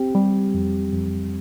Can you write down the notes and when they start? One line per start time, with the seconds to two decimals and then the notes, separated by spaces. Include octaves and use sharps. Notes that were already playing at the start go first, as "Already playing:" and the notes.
Already playing: C4 G4
0.15 G3
0.54 F2
0.93 F2